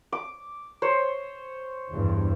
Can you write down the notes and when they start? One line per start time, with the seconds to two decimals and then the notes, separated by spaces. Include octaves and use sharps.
0.12 D6
0.82 C5 C#5
1.91 E2 G2